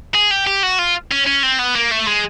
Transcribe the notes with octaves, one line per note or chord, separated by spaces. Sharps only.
G#4
G4
G4
F#4
F4
C#4
C#4
C4
B3
A#3
A3
G#3